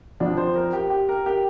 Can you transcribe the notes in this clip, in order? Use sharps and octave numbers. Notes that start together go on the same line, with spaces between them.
F2 F3 D4
C5
A#4
G4
G4
A#4
G4